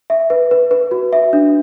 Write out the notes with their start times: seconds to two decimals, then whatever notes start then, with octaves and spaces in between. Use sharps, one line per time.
0.10 E5
0.30 B4
0.51 B4
0.71 B4
0.91 F#4
1.13 E5
1.33 D4